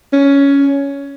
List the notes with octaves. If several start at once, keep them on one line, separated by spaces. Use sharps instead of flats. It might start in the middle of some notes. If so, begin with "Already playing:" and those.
C#4